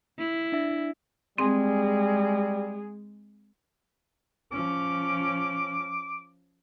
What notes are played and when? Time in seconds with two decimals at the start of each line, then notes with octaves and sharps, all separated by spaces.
0.18 E4
0.52 D4 E5
1.38 G3 G#3 C4 G#4
4.52 F3 C#4 D6